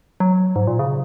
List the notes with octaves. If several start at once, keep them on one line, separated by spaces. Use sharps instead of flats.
F#3
G#2
A#2
C#3